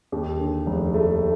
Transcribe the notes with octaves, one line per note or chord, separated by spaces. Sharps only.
D#2
D3
F1
A3